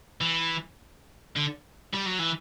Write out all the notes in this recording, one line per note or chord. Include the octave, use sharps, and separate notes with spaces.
E3
D3
G3
F#3
E3